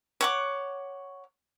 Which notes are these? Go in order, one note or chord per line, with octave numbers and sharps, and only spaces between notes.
C#5 F#5 D6